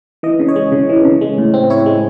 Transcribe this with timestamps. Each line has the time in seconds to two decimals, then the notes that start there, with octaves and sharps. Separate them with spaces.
0.23 E3 D#5
0.40 C#3
0.49 C#5
0.56 G#3
0.72 C#3
0.89 E3
1.05 C#3
1.21 G#3
1.38 A2
1.54 C4
1.70 E4 C#5
1.86 G#3